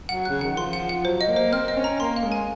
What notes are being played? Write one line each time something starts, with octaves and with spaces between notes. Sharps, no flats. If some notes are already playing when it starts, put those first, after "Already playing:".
F#3 F#5
C#3 F#6
D#3 F#5
F3 C6
F#5
F#5
F#3 C5
D#5
A#3
C5
C4 F6
D#5
C#4
A#5
A#3 C6
F5
G#3
G#5